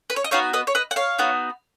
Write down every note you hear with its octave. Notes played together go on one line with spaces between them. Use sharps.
B4
C#5
D#5
B3 D#4 F#4 C#5 F5
B4 D#5
C#5
B4 D#5
F#5
C#5 F5
B3 D#4 F#4